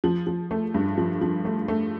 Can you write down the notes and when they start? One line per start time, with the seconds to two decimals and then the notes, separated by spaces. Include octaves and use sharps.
0.04 F3
0.27 F3
0.51 A3
0.74 G2
0.98 F3
1.21 F3
1.45 A3
1.68 A3